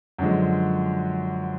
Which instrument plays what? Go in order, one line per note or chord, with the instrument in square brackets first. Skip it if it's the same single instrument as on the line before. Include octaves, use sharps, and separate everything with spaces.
[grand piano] F#2 D3 F3 G#3